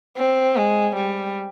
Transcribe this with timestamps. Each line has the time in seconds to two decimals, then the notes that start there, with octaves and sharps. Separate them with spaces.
0.17 C4
0.56 G#3
0.96 G3